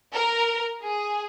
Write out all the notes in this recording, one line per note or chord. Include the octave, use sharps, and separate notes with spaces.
A#4
G#4